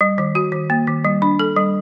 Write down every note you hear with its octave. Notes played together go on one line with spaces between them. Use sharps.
G3
D#3
F#4
D#3
A#3
D#3
G3
D4
A4
G3